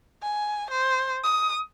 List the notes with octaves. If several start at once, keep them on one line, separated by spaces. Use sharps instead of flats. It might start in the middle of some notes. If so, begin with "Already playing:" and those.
G#5
C5
D#6